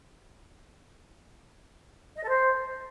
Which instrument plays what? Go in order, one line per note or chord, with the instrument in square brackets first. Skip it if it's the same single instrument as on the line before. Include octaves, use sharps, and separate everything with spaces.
[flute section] D#5
A4
C5